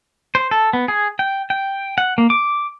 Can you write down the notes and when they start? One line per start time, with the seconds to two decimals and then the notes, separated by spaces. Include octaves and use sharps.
0.35 C5
0.51 A4
0.73 B3
0.88 G#4
1.19 G5
1.50 G5
1.98 F#5
2.18 A#3
2.30 D6